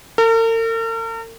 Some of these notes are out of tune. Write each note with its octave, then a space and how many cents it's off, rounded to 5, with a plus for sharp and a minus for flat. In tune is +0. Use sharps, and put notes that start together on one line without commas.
A#4 -45